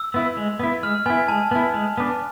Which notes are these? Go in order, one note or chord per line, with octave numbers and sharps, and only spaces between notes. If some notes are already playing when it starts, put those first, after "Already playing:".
Already playing: E6
B3 E4
G#3
B3 E4
G#3 F6
B3 E4 G#5
G#3 A5
B3 E4
G#3
B3 D4